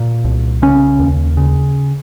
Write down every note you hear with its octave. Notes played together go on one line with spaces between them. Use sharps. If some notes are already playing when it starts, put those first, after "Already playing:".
Already playing: A#2
C2
C#3 C#4
D#2
C#3